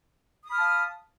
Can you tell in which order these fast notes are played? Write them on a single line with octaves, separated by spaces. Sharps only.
D#6 B5 F6 A5 F5